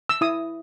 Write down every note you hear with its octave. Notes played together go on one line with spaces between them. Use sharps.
E6
E4 D#6